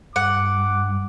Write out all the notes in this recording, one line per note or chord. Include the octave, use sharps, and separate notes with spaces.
G2 F#5 D6